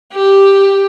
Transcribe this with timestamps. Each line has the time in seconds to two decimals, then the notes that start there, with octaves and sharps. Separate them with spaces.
0.13 G4